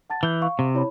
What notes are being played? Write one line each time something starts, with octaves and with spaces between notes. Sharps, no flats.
F#5 A5 A6
E3 G6 G7
F5 C#6
C3
E4 C#5 B5